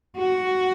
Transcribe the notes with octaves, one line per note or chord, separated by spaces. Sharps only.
F#4